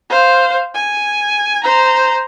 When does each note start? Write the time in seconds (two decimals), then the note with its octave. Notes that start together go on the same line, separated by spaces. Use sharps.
0.10 C5 F5
0.74 G#5
1.64 C5 A#5